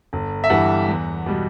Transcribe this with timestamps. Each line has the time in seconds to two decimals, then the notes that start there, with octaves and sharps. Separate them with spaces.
0.13 G1
0.44 E5
0.50 G2 E3 G3 F#5
0.88 E2
1.26 B2 G3